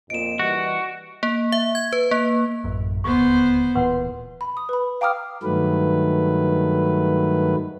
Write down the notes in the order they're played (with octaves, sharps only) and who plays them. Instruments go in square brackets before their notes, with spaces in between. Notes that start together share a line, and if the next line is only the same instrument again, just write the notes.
[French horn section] F2 A#2 [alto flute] D#5 [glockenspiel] D7 E7
[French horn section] E3 G3 [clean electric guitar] F#4
[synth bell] A#3
E5
G#6
B4
A#3
[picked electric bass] A1 F#2
[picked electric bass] D#1 D2 [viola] B3 C5 [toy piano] C#6
[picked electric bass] D1 A#2 E3 [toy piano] B4 F#5 C6
[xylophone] B5
D#6
B4 B5
F5 G5 A#5 D6 D#6 F6
[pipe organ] G2 D#3 F#3 A3 B4